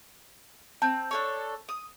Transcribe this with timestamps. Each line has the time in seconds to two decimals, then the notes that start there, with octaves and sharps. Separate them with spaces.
0.82 C4 A5 G6
1.11 D4 A4 C#5
1.69 D#6